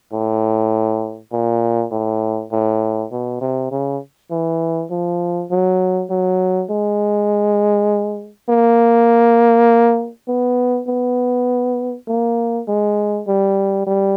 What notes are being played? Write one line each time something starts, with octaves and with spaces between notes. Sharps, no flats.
A2
A#2
A2
A2
B2
C3
C#3
E3
F3
F#3
F#3
G#3
A#3
B3
B3
A#3
G#3
G3
G3